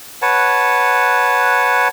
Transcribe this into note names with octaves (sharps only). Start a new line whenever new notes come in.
B4 C#5 F#5 A5